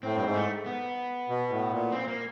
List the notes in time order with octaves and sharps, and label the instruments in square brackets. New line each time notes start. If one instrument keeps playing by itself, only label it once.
[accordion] A2 [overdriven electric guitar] C4
[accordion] G2
[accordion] G#2 [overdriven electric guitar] C4
[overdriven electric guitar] A3
B3
[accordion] B2
A2
A#2
[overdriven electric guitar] C4
A#3